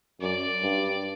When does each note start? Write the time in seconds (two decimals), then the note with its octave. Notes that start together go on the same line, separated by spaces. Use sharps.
0.21 F#2 D5
0.63 G2